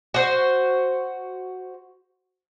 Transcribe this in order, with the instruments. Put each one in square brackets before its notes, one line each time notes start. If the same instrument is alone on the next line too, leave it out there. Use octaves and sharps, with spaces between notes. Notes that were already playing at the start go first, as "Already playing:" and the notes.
[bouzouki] F#4 C5